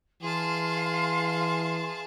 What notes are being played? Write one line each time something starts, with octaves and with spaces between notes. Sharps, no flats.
E3 G#4 F5 A5 C6